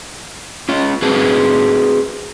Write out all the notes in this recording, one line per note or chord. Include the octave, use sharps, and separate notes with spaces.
C#4 F4
C4 F#4 G#4 B4 A5